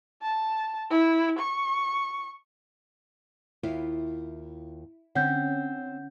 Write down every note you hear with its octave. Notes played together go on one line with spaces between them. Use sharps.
A5
E4
C#6
D#2 E4 F4 F5
D3 C4 C#4 F#5 G6